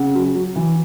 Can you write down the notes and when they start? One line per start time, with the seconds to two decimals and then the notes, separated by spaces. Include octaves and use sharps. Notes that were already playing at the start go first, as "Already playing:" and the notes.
Already playing: C#3 F#5
0.15 F#3
0.35 F#3
0.56 E3